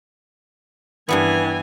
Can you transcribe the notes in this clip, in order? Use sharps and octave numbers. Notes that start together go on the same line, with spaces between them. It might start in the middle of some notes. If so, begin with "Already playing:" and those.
G2 E3 G3 B3 G#5